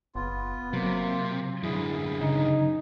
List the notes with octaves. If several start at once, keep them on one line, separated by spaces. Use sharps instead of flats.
F#1 B3 F4
C3 F#3 A#3
F#2 D3 E4 G#4
C#3 D#4